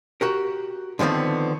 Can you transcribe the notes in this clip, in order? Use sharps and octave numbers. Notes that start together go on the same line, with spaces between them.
F#4 G4 A#4
D3 D#3 F3 B3 C4